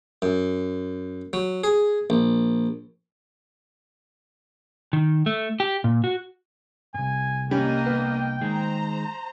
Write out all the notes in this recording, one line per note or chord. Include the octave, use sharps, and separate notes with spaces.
F#2
F#3
G#4
A#1
D#3
A3
G4
A#2
F#4
C2 F2 G#5
G3 A#3 C#4 D4 D#5 G5
B3
D#3 G#3 G#4 C5 A#5